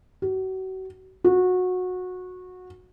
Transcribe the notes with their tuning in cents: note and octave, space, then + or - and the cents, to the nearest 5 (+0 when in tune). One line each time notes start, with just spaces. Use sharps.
F#4 +35
F#4 -20